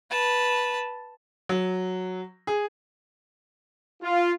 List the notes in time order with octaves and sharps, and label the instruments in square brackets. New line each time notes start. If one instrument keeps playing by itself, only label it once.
[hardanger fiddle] B4 A5
[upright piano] F#3
G#4
[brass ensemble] F4